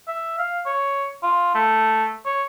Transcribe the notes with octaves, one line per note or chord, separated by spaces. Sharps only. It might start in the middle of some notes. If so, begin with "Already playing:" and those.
E5
F5
C#5
F4
A3
C#5